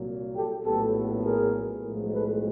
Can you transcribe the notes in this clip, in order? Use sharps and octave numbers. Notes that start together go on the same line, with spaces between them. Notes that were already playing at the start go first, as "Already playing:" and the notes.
Already playing: C2 A#2 F#3
G4 A4
A#1 A2 F#3 B3 G4 A4
G#4 A#4
B1 A2 F3 G#3
A4 B4